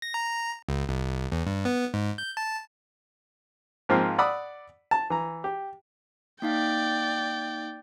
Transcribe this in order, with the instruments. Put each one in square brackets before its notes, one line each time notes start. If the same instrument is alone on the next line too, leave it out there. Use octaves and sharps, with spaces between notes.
[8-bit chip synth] A#6
A#5
C#2
C2
E2
G2
B3
G#2
G6
A5
[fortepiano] G#2 F3 A#3 C4 F4
D5 F#5 B5 D#6 E6
A5
E3 A#5
G4
[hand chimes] A#3 D#4 F5 [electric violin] D5 G5